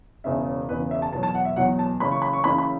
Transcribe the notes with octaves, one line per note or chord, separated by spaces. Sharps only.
E1 E2 C#3 E5
E1 E2 C#3 B4
E5
A5
E2 B2 F#3 A5
A5
F#5
E5
E2 B2 F#3 F#5
A5
F#1 F#2 C#3 E3 B5
C#6
B5
C#6
F#1 F#2 C#3 E3 B5
B5